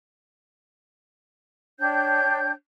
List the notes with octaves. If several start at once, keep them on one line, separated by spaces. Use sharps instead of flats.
D4 C#5 G5 G6